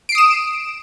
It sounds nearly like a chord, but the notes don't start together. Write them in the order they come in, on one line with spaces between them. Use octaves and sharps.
D7 C7 D#6 E7